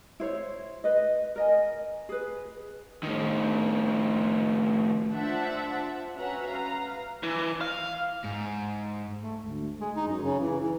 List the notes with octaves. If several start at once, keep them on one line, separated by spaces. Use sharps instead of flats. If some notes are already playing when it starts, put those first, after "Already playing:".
E4 C5 C#5
B4 D#5
A#4 D#5 G#5
G#4 B4
A2 D#3
D4 F4 C5 E5 F#5 A5
C#4 F#4 B4 E5 F#5 A#5
B4 F5 A#5
E3
F5
G#2
A3
D2
G#3
D#4
F#2
C#3
E3
E3